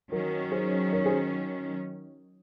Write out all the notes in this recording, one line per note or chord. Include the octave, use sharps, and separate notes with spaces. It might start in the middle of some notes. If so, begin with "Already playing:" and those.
D#3 F#3 C#4 F#4 A#4
G#4 C5
A#4 C#5
G#4 C5